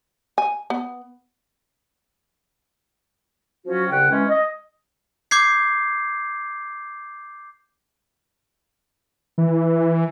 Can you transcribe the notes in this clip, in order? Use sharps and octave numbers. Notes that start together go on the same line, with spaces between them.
G#5
B3
F3 F#3 C#4 F#4
C2 C#3 F#5 G5
E3 G#3 C#4
D#5
D6 G6 G#6 C7
E3